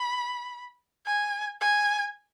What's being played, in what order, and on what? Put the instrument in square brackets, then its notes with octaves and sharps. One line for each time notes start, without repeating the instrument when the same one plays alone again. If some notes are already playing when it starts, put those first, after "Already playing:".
Already playing: [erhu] B5
G#5
G#5